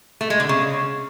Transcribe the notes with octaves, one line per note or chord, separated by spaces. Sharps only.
A3
G#3
D3
C#3